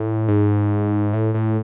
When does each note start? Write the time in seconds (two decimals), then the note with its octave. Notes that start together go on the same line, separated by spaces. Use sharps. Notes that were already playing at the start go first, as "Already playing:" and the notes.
Already playing: A2
0.28 G#2
1.13 A2
1.34 A2